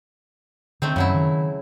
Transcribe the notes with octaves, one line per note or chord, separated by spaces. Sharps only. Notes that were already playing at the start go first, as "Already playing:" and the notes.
D3 D#3 A3 C4
F#2 C#3 F#3 E4
D#3